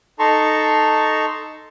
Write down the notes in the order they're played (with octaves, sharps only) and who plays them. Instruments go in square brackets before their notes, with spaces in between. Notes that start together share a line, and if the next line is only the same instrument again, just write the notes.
[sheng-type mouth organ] D#4 A4 A5 A#5 C6 C#6